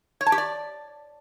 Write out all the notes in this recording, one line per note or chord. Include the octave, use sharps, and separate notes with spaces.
C#5
A5
G4
D5